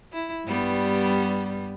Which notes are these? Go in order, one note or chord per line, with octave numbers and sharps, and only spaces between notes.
E4
G2 G3 B3